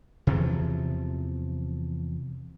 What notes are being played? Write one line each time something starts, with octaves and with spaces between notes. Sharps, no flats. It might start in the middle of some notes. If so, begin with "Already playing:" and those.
E2 C3 E3 F3